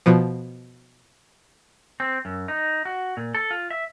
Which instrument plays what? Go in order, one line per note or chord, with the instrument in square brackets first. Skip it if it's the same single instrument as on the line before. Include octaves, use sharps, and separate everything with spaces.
[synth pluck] B2 F3
[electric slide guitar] C4
F#2
D#4
F#4
A#2
A4
F4
E5